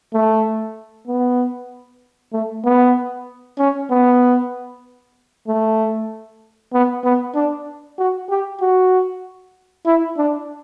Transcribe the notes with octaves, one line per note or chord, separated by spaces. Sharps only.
A3
B3
A3
B3
C#4
B3
A3
B3
B3
D4
F#4
G4
F#4
E4
D4